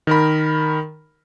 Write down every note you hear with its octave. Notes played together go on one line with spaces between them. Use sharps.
D#3 A#4 B5